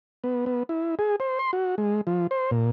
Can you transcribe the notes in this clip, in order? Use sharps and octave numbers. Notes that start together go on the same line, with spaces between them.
B3
B3
E4
G#4
C5
C6
F#4
G#3
F3
C5
A#2